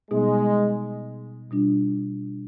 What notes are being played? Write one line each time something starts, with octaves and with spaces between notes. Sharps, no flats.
B2 G3 G#3 B3 D#4 G#4
B2 G3 D4 F4